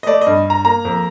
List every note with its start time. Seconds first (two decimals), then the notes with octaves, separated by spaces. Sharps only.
0.03 D#5
0.06 A3 D5
0.21 D#5
0.27 G2
0.45 G2
0.50 A#5
0.65 A#3 A#5
0.85 F2